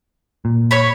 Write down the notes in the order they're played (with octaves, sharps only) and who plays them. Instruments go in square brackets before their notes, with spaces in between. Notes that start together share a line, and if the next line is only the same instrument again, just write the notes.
[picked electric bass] A#2
[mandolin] C#5 B5